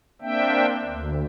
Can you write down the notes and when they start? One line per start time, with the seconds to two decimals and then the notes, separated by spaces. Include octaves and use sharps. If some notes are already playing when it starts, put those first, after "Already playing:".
0.22 A#3 C4 D4 E5 G5
0.84 D2